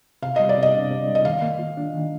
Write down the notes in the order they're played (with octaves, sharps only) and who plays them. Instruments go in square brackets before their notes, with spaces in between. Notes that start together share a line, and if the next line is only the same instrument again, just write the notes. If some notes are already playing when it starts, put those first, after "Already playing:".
[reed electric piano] C3 [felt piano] F5
[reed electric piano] G3 [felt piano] D#5
[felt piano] D5
[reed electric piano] C3
[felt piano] D#5
[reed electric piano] D4
C3
G3
[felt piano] D#5
[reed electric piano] D#3 [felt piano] F5
[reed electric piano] A#3
F4
D4
D#3